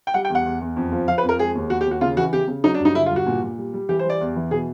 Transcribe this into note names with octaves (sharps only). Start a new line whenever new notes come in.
G5
G3 F#5
G5
E2
F#5
E2
E2
F2
F3
F3 F5
B4
F2
A#4
G#3 G#4
D#2
D#2 F#4
G4
D#2
F#4
C#3 F4
E3 F#4
C#3 G4
C#3
F#3 D#4
D4
G2
D#4
D3 E4
F4
G2
F#4
A#2
A#2
G3
G3
E3 G4
C5
G3 D5
E2
E3
B2 G#4